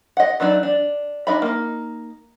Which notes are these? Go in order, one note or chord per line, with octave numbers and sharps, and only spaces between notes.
D#5 F#5
E3 F#3 D4 D#4
D4
D4 D#4 D#5 E5 B5
A#3 D#4